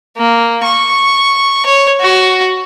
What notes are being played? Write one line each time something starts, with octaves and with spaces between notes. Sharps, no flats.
A#3
C#6
C#5
F#4